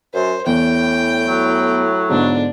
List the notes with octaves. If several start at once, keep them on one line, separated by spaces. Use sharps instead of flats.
F#2 C5
E2 A2 G5
F#3
G#2 B2 D3 D4